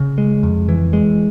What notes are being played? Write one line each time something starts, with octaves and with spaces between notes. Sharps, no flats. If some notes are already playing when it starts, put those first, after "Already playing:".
Already playing: C#3
G#3
F2
E3
G#3